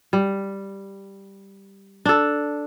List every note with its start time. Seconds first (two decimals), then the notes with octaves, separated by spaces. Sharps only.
0.13 G3
2.05 D4 A4